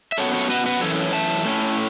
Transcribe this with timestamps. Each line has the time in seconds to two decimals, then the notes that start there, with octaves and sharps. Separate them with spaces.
0.12 E5
0.18 F#2 F#3 B3 A4 C#5
0.34 A4 C#5
0.49 F#4 B4
0.66 F#4 B4
0.81 F#2 E3 C#4 A4 C#5
1.13 E5 A5
1.45 A2 A3 C#4